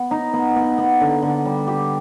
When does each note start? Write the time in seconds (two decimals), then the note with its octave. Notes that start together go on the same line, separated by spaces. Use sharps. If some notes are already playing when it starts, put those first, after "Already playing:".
Already playing: B3
0.11 D#4
0.33 B3
0.56 B3
0.78 B3
1.01 D3
1.22 D3
1.46 G3
1.67 G4